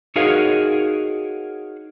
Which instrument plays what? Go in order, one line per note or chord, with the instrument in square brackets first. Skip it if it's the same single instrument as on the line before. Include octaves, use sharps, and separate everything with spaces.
[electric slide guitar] D#4 F#4 G#4 A#4 C#5 F5